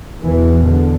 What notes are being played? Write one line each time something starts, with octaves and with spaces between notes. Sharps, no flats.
E2 B2 E3
D3